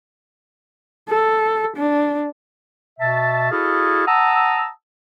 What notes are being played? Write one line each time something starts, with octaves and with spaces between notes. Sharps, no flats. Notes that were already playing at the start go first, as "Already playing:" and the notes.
A4
D4
B2 E5 A5
E4 F#4 G#4 A4 D#5 F5
F#5 A5 A#5 D#6 E6